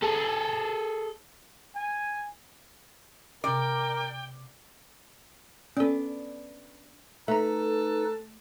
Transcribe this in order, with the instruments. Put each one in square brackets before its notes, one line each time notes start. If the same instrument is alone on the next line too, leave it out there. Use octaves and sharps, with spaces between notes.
[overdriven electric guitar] G#4 A4
[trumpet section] G#5
[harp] C3 B3 [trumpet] A#4 [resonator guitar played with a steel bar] D5 [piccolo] G5
[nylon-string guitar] B3 D4 [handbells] C#4 A4
[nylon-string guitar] A3 [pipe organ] D#4 B4 [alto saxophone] A4 [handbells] E5 A#5